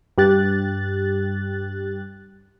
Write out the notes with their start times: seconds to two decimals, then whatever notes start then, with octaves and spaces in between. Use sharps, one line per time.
0.18 G2 G4 F#6 A6